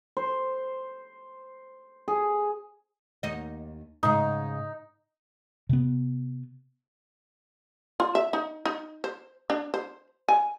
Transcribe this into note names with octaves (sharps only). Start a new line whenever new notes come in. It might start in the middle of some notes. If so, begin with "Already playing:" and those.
C5
G#4
D#2 D#4 D#5
G#2 C#3 D#4
C3 B3
F4
E5
D#4
D#4
C5
D4
C5
G#5